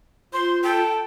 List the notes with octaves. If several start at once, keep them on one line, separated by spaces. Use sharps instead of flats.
F4 C5 C6
A4 G5